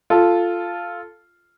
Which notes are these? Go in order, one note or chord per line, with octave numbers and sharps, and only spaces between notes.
F4 A4